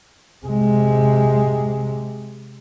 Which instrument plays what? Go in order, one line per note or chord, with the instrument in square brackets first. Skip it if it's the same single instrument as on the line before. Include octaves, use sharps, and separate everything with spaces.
[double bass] C3 G#3